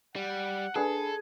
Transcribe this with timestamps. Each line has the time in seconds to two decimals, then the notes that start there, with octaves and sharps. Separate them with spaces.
0.16 G3 F#5
0.76 D4 G#4 A4 B4 C7